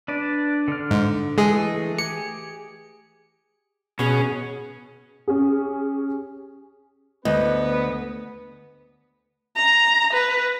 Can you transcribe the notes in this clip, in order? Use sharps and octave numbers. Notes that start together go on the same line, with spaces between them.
D4 B4 D5
D3 F6
G#2
E3 G#3 A3 G#4 D#5
G4 G#4 C#7
B2 C#4 G#4
C#4 G4 G#4
D2 B3 B4 D#5
A#5
B4